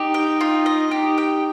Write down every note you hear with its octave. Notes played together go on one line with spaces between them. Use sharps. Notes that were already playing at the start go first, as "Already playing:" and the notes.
Already playing: D#4 G4
G5
F4
D#5
D#4 G4
G5